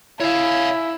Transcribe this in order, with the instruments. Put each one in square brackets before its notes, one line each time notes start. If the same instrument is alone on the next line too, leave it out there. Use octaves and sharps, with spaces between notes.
[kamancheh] E4 [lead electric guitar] C#5 F5